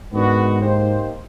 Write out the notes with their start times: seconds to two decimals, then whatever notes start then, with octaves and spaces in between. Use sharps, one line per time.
0.12 G#2 D#3 G#3 B3 D4 F#4
0.62 A#3 D#4 G4 C5